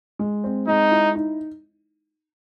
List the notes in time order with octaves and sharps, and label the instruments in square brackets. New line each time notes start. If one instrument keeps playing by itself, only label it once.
[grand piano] G#3
C4
[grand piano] G#3 [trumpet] D#4
[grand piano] E4
D#4